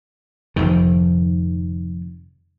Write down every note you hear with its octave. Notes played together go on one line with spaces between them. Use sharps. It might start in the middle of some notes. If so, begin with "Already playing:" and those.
F1 F2 G#2 D#3